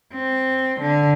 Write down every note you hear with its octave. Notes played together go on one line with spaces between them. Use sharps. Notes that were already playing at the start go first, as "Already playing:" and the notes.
C4
D3